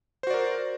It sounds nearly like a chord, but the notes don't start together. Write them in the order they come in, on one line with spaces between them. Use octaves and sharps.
C5 F#4 D5 A#4